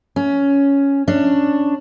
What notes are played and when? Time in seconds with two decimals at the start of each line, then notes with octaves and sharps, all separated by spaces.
0.16 C#4
1.08 C#4 D4